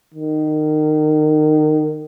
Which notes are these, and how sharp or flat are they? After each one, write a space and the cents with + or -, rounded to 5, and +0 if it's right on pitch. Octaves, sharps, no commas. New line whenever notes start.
D#3 -25